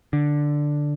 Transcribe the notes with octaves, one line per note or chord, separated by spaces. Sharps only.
D3